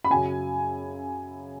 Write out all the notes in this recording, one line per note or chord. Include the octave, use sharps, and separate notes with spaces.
B5
F#2 C#3 F#3 G#5